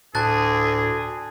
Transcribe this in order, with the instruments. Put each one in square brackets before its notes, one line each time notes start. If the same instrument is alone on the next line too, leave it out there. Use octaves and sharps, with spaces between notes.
[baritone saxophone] D2 [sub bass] A2 [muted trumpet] G#4 [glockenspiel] A5 F#6 A6